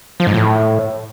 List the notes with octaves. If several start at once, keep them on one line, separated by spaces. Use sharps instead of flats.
F3
G#2
A2